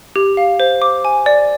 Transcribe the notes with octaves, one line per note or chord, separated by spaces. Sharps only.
G4
F5
C5
D6
G#5
D5